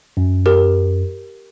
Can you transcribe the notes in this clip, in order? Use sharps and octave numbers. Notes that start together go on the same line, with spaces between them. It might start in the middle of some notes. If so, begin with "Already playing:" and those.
F#2
G4 A#4